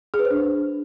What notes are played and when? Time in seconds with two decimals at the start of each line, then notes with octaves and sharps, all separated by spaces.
0.14 G#4
0.19 B4
0.25 C5
0.30 D4